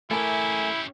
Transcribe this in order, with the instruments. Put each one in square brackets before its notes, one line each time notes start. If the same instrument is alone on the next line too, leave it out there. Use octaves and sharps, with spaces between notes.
[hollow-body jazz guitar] A3 A#4 [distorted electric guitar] C#4 G4 [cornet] E4 [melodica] G#5